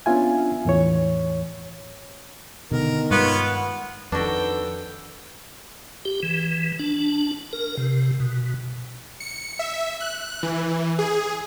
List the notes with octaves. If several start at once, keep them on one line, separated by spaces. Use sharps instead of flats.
B3 C#4 D4 F4 E5 G#5
E2 A2 E3 C#5
B2 D3 D#3 B3 A#4
G2 G3 G#3 B3 F4 C#5 F5
F2 D#3 D4 F#4 A4 B4 G5
G4
E3
D4
A#4
C3
B2
C#7
E5
F#6
E3
G#4